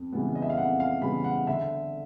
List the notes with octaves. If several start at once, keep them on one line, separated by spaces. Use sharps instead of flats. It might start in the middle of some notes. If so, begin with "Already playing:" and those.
Already playing: F2
C#3 E3 G3 B3
D#5
E5
F5
F2 F#5
F5
C#3 E3 G3 B3 B5
F#5
D3 E5